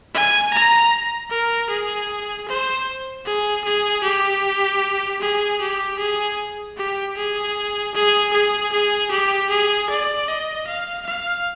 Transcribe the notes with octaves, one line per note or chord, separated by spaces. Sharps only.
G#5
A#5
A#4
G#4
C5
G#4
G#4
G4
G#4
G4
G#4
G4
G#4
G#4
G#4
G#4
G4
G#4
D5
D#5
F5
F5